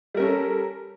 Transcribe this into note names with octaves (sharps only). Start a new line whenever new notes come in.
G3 C#4 A4 A#4